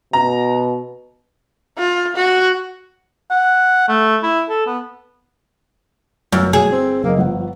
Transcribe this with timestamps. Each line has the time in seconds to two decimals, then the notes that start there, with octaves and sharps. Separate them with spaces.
0.13 B2 A#5
1.79 F4
2.16 F#4
3.31 F#5
3.89 A3
4.23 E4
4.49 A4
4.67 B3
6.32 G1 F#2 E6
6.53 F#3 G#4
6.72 C4
7.04 F#1 A#3 D#5
7.17 G1 F3 F#5